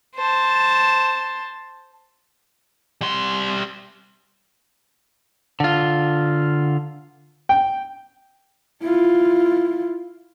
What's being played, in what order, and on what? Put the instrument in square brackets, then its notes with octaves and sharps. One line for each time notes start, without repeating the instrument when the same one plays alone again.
[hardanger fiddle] C5 A5
[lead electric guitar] G3 C6
D3 F4
[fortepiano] G5
[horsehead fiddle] E4 F4